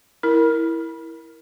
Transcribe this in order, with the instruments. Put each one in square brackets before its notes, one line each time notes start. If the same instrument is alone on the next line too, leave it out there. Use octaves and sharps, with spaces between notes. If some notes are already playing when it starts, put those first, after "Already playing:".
[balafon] E4 A#4